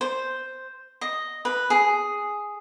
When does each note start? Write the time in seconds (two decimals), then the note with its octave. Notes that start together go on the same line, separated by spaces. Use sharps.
0.01 C5
1.01 D#5
1.45 B4
1.70 G#4